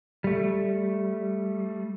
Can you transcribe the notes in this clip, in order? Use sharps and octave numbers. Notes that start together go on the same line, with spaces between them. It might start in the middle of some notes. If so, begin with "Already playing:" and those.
G3 A3